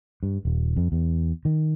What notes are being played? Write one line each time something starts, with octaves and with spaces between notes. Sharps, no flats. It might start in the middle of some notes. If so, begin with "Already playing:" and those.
G2
D#1
F2
E2
D#3